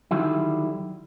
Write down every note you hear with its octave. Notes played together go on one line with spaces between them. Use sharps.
D3 D#3 F#3 G3 E4